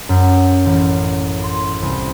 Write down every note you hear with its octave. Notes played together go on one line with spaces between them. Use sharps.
F#2
A1
C6
C2